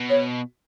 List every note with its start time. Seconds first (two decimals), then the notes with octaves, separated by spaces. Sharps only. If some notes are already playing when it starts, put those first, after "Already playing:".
Already playing: B2
0.10 C#5